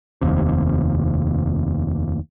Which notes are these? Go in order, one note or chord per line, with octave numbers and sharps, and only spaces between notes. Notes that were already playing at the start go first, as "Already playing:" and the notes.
F1 D#2 C3